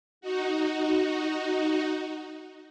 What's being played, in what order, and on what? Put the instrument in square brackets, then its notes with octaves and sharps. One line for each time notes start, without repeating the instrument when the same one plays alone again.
[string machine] D#4 F#4